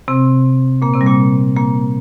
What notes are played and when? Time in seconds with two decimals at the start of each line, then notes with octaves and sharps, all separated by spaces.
0.08 C3 C4
0.82 A#2 A#3
0.94 C3 C4
1.01 G3
1.06 A#2 A#3
1.56 A#2 A#3